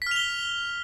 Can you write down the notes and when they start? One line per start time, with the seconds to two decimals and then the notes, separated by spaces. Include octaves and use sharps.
0.02 B6
0.07 F6
0.11 F7
0.16 G7